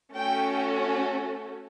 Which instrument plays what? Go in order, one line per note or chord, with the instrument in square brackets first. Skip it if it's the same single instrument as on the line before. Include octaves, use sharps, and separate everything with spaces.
[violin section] A3 C#4 F#4 A4 G5